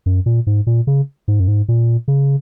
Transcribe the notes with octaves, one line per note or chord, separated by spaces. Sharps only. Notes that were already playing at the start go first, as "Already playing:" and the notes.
F#2
A#2
G#2
A#2
C#3
G#2
F#2
G#2
A#2
C#3